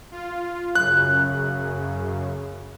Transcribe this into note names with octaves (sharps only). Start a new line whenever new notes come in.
F4
F#2 C#3 F#6